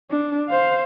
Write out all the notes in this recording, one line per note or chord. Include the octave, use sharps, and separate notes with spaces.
D4
C5 F5